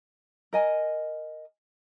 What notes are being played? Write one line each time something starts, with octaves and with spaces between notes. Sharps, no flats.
A#4 D#5 G#5